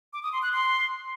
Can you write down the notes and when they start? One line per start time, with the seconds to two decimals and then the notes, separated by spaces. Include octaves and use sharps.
0.13 D6
0.23 D#6
0.33 C6
0.43 F#6
0.52 C6